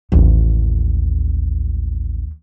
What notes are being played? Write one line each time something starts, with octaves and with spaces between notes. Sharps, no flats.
A1 D#2